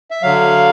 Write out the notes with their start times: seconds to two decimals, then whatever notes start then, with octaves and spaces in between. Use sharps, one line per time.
0.11 E5
0.22 D3 F#3 F5